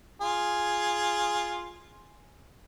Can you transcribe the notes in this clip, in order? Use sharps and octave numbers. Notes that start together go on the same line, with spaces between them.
F4 G#4